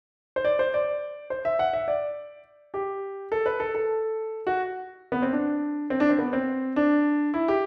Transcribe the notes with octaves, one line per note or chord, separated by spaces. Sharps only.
C5
D5
C5
D5
C5
E5
F#5
E5
D5
G4
A4
B4
A4
A4
F#4
B3
C4
D4
C4
D4
C4
B3
C4
D4
E4
G4